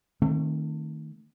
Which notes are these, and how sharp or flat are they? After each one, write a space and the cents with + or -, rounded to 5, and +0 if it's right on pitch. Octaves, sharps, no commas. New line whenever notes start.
D#3 +0 A3 +30 C4 +25